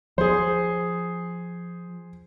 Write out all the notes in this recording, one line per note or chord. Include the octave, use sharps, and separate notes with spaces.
F3 G#4 C5